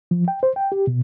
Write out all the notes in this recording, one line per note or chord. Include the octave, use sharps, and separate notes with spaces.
F3
G5
C5
G5
G4
B2